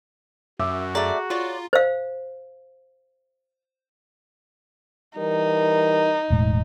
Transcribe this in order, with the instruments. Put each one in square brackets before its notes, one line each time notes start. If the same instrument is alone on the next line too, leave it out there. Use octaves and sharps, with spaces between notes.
[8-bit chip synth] F#2 [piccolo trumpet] F#4 [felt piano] E5 D6 E6
[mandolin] A3 D5 [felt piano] G#4 A#5
[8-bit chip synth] F4 [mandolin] C#5 D5
[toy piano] C5 F5
[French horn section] E3 G3 A#4 [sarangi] D#4
[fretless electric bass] E1 A2 G#3